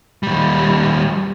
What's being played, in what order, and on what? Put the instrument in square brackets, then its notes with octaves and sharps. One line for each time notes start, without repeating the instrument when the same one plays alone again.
[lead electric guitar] D#2 G3